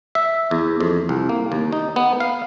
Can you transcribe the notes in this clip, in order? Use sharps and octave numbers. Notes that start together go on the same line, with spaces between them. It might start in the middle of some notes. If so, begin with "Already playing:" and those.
E5
E2
F2
C2
A#3
D#2
D#4
B3
F5